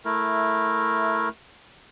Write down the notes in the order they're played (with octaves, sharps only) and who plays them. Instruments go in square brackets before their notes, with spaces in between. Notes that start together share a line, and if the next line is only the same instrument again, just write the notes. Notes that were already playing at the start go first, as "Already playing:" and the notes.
[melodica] A3 E4 A#4